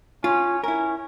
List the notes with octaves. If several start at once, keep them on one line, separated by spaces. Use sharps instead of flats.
C#4 F4
C#4 E4 A#4